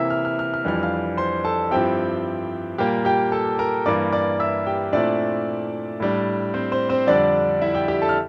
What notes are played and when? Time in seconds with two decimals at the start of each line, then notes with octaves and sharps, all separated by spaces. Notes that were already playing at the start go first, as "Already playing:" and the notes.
Already playing: C3 E3 A#3 E4 E5 E6
0.10 F6
0.25 F6
0.39 F6
0.54 F6
0.64 F2 E3 G3 D4 F6
0.83 F5 F6
1.17 C5 C6
1.45 A4 A5
1.71 G2 F3 C4 E4 G4 G5
2.78 A#2 G3 A#3 G4 G5
3.05 G4 G5
3.32 A4 A5
3.59 A#4 A#5
3.86 G2 E3 A#3 D5 D6
4.13 D5 D6
4.40 E5 E6
4.66 G4 G5
4.93 A#2 A3 C4 D4 E4 D5
6.00 A2 G3 D4
6.54 C4 C5
6.72 C4 C5
6.89 C4 C5
7.07 F2 D3 G3 D4 D5
7.61 E4 E5
7.75 G4 G5
7.88 G4 G5
8.02 A4 A5
8.09 F6